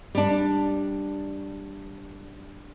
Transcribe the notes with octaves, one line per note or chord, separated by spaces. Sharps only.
G3 D4